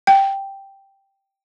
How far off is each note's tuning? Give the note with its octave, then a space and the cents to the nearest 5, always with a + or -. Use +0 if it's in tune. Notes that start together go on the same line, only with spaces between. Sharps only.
G5 +0